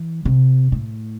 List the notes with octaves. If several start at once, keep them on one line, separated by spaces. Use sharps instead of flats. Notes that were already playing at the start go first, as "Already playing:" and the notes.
Already playing: E3
C3
A2